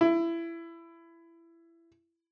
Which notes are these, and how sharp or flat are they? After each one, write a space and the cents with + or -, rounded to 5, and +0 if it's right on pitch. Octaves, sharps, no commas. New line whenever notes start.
E4 +20